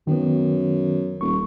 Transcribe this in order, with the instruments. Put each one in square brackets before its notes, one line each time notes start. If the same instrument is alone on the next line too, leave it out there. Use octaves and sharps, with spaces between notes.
[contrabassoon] F#2 [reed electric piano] D#3 B3
[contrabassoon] D#1 [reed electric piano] C#6